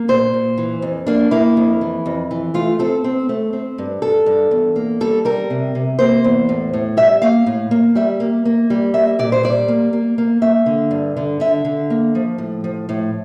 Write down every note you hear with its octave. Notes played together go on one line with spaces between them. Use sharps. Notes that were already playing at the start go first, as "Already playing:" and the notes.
Already playing: A#3
A#2 C5
A#2
E3
F2
A#3 D4
A#3 E4
F2
E3
F2
E3
A3 F4
C4 A4
C4
A3
C4
G2
G2 A4
G2
E2
A#3
G3 A4
G3 A#4
C3
C3
A#3 C5
E2
A2
A2
G3 E5
A#3 F5
A2
A#3
G3 E5
A#3
A#3
G3
A#3 E5
A#2 D5
C5
G3 D5
A#3
A#3
A#3
A#3 E5
D3
G2
D3
D3 E5
D3
A#3
F3
A2
F3
A2